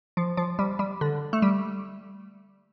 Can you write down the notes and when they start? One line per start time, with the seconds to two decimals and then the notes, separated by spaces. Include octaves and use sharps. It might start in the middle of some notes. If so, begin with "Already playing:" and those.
0.17 F3
0.37 F3
0.59 G3
0.79 G3
1.01 D3
1.33 A3
1.42 G3